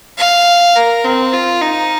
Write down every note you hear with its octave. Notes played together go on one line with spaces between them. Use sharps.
F5
A#4
C4
F4
D#4